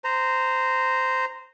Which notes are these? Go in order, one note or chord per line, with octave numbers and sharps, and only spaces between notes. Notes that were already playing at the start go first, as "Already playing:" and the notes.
C5 A#5